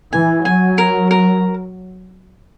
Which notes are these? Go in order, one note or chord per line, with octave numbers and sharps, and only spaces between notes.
E3 G#5
F#3 G#5
A#4
A#4